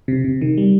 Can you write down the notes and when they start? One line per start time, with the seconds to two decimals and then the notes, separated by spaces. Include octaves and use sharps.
0.08 C3
0.24 C3
0.42 D#3
0.58 G3